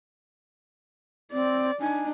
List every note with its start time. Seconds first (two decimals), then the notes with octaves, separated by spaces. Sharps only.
1.33 C4 D5
1.80 D4 D#4 G#5